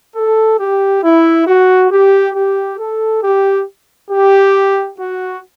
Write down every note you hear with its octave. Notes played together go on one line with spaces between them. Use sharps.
A4
G4
E4
F#4
G4
G4
A4
G4
G4
F#4